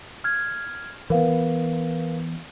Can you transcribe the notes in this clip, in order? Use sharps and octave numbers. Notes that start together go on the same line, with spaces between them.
F6 G#6
E3 B3 A#4 B4 F5